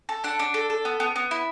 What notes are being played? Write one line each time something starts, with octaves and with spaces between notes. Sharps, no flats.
A4
D4 F#5
D4
A4
A4
B3
B3
B3
E4